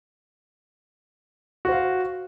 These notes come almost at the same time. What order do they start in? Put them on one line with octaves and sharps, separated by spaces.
F#4 C5 F5